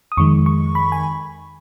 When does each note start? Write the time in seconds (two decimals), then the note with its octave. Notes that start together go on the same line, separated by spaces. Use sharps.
0.12 D#6
0.17 F2 D#3 G#3 C#6
0.46 C#6
0.75 B5
0.92 G#5